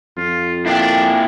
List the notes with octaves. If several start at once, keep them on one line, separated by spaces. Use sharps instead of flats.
F2 F4
A#3 D4 E4 G5